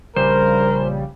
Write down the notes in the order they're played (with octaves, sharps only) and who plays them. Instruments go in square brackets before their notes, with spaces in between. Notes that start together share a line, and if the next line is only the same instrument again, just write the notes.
[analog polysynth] A#1 C#3 G3 [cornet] A#4 [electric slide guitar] C5